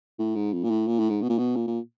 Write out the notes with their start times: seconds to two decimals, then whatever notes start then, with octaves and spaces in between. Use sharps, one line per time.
0.19 A2
0.36 G#2
0.53 F2
0.64 A#2
0.70 A2
0.87 A#2
0.99 A2
1.10 G#2
1.22 B2
1.30 A#2
1.38 B2
1.56 A#2
1.67 A#2